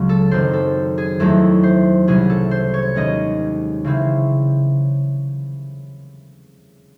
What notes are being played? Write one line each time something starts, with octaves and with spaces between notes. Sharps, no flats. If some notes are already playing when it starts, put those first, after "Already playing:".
Already playing: C#2 C#3 F#3
A4
F#2 D#3 F#3 C4 C5
A4
G#4
E2 D#3 F#3 A3 C4 A4
C5
C2 C3 F#3 C#4 G#4
A4
C5
C#5
D#2 D#3 G#3 C#4 D#5
C#3 E3 C4